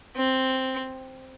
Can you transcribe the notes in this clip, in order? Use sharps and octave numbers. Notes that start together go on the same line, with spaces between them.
C4